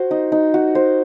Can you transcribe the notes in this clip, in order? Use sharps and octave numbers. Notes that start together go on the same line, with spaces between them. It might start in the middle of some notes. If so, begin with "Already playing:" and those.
Already playing: F#4 C5
D#4
D#4
F#4
C5